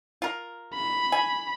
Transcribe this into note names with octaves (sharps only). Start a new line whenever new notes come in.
F4 A#4
B5
G#5